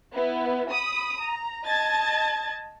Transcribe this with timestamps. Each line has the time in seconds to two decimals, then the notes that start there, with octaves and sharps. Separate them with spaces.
0.14 B3 E4
0.71 B5 D#6
1.21 A#5
1.67 D#5 A5 G#6 A6